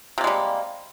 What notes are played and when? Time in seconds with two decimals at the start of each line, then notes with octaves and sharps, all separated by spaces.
0.18 C3
0.21 A#3
0.24 G#3
0.27 G3